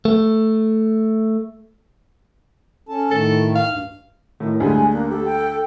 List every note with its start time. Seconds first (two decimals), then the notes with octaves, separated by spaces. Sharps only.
0.05 A3
2.89 C#4 A4 A5
3.11 A2 D#3 A3 A4
3.56 F5
3.71 D2 G2
4.40 A2 D#3
4.60 D2 G3 G#3 G#5
4.92 A#3 D4
5.09 G4 A4
5.25 G5